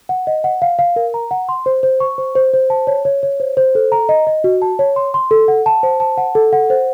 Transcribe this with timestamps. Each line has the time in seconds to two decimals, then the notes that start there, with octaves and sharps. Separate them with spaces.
0.09 F#5
0.27 D#5
0.44 F#5
0.62 F5
0.79 F5
0.96 A#4
1.14 A#5
1.31 F#5
1.49 C6
1.66 C5
1.83 C5
2.00 C#6
2.18 C5
2.36 C5
2.53 C5
2.70 A5
2.87 C#5
3.05 C#5
3.23 C#5
3.40 C5
3.57 C5
3.75 A4
3.92 A#5
4.09 D#5
4.27 D#5
4.44 F#4
4.62 A5
4.79 C#5
4.96 C6
5.14 C6
5.31 A4
5.48 F#5
5.66 A5
5.83 C5
6.00 A5
6.17 F#5
6.35 A4
6.53 F#5
6.70 C5